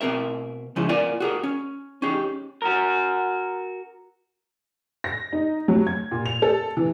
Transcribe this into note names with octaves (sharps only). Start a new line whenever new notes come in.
B2 C4 A#4 E5
C#3 F3 G#3 C#4 E4
B3 F4 A#4 D5 G#5
F#4 G#4 A#4
C#4
C#4 D#4 G4 G#4
F#4 A#4
A#6
D#4
F#3
G#6
A#2
F7
A4
E3